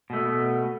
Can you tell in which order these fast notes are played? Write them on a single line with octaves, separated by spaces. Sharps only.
B2 A3 B3